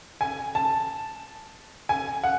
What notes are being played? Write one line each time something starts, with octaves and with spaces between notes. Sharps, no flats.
G#5
A5
G#5
F#5